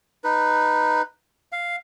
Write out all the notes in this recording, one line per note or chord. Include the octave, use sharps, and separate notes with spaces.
D#4 B4
F5